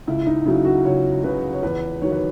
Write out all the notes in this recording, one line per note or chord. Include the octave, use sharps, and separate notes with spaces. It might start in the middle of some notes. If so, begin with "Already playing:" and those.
C#2 E4
D#4
C#3 F#3 E4
F#4
C#2 C#5
C#3 F#3 B4
C#5
E2 B4
D#3 F#3 C#5
B4